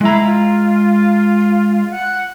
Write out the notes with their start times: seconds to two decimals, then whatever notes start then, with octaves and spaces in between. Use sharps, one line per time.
0.01 G#3 E4 A#5
0.25 F4
1.91 F#5